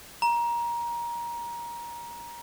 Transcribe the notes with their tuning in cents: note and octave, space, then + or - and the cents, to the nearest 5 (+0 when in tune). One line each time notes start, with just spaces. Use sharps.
A#5 +20